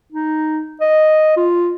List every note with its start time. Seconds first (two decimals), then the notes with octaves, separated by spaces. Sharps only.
0.12 D#4
0.81 D#5
1.37 F4